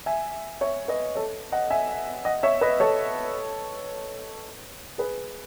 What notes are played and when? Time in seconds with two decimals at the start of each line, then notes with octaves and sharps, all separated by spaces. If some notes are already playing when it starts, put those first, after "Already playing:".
0.06 E5 G#5
0.61 C#5 E5
0.88 B4 D#5
1.15 A4 C#5
1.52 D#5 F#5
1.70 E5 G#5
2.25 D#5 F#5
2.43 C#5 E5
2.61 B4 D#5
2.80 A4 C#5
4.98 G#4 B4